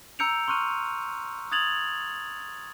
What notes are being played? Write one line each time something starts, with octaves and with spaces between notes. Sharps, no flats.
A#5 E6 G6 C#7 D7 F7
C6 C#6 F6 F#6 D#7
D#6 F#6 G#6 A6 F7 F#7